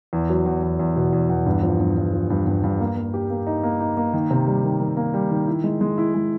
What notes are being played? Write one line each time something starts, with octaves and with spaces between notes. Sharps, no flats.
E2
F#3
E2
E2
E2
B2
E2
E2
G2
F3
G2
G2
F3
G2
G2
G2
A#3
A#3
G4
A#3
D#4
A#3
D#4
A#3
D#3
C3
G3
D#3
D#3
A#3
G3
D#3
E4
G#3
G#3
E4
G#3